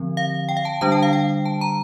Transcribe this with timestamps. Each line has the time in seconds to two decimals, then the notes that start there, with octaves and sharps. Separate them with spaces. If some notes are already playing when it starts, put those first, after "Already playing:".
Already playing: D3 F3 C4
0.17 F5
0.49 G5
0.57 F5
0.65 A5
0.81 D3 G3 D4 A5
0.92 G5
1.03 F5
1.13 G5
1.45 A5
1.61 A#5